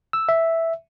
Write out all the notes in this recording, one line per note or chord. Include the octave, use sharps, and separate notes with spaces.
E6
E5